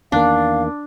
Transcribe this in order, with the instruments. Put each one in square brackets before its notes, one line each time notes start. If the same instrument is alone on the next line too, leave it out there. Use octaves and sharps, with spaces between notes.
[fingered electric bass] E2 D#3 A#3 [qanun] D4 [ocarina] F5